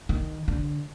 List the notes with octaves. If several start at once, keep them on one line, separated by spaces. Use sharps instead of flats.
D#3
D3